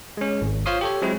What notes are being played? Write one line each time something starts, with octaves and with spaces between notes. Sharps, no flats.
G#3 C#4
G#1
F4 C5 C#5 F5 C6 D#6
G4 A4 C#5
F#3 G#3 C4 E4